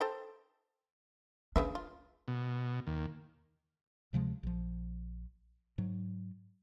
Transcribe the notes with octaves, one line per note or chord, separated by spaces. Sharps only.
A4 C5 G5
C#3 D4 B4 E5
F4
B2
D#2
D2 C3 F3 G#3
A#1 F3
G#2 F#3